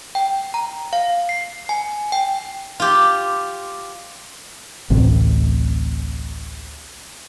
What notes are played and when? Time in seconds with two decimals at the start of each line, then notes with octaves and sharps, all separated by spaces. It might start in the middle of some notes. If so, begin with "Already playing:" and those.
0.15 G5
0.54 A#5
0.93 F5
1.29 C7
1.69 G#5
2.12 G5
2.80 F4 G4
4.90 A1 D2 C3